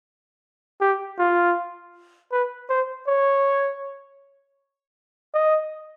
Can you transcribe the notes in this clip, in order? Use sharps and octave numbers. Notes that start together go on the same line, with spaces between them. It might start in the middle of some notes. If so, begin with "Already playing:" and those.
G4
F4
B4
C5
C#5
D#5